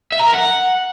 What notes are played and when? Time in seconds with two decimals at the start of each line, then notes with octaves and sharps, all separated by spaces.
0.12 E5
0.20 A#5
0.27 A#4
0.34 F#5